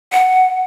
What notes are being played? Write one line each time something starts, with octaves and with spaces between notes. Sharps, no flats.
F#5